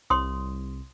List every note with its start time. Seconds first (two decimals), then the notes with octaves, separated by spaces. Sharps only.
0.10 C2 C#5 C6 D#6